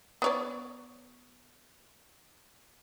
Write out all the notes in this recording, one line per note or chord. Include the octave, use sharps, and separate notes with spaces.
B3 C#5 D5